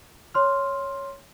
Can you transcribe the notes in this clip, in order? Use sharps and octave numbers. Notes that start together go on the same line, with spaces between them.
C#5 C6 F6